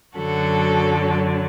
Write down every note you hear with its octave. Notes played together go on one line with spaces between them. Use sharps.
F#2 D3 F#3 F#4 A4